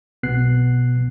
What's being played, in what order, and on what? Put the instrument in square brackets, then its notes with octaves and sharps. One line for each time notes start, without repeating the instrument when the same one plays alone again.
[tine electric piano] B1 B2 B3 F#6 C7